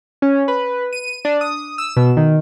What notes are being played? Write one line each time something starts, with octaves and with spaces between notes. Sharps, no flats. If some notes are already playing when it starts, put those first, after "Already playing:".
C#4
B4
D#7
D4
D#6
E6
B2
D#3